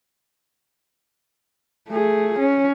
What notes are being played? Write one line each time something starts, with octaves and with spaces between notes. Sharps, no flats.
A3 G#4
C#4